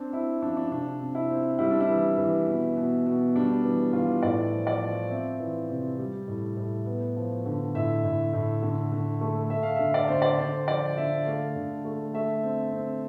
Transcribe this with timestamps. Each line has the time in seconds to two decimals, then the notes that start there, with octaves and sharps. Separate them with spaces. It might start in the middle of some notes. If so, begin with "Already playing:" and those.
Already playing: C4 D4
0.13 C4 E4
0.42 F3 D4
0.57 D4
0.71 C3 D4
1.01 C3
1.15 E4
1.30 C4
1.59 G3 E4
1.71 D4
1.80 E4
1.88 E3
2.18 E3
2.47 B2
2.77 B2
3.06 B2
3.36 G3 D4
3.65 E3
3.93 E3 F4
4.23 A2 D5
4.52 F3
4.67 D5
4.82 F3
5.10 C4 E5
5.40 E3
5.69 C3
5.99 G3
6.28 A2
6.57 A2
6.86 B3
7.17 F3
7.46 D3
7.75 A2 E5
8.04 A2
8.33 A2
8.62 D3
8.92 D3
9.21 A3
9.50 A3 E5
9.63 F5
9.76 D3 E5
9.94 D5
10.08 D3 C5
10.22 D5
10.39 D3 C5
10.67 F3 D5
10.97 D3 E5
11.26 A3 F5
11.56 D3
11.85 A3
12.14 A3 E5
12.43 C4
12.72 C4